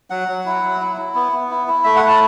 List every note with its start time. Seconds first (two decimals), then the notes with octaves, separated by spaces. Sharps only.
0.10 F#3 F#5
0.28 F#3
0.46 E4
0.63 F#3
0.80 E4
0.98 E4
1.15 B3
1.32 B3
1.50 E4
1.68 E4
1.84 A3 E5
1.96 F#5
2.03 E4
2.08 A5